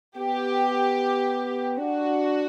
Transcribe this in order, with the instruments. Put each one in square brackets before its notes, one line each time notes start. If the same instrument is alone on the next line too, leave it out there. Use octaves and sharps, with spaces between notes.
[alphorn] B3 [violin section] G4
[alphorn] D4 [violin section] F#4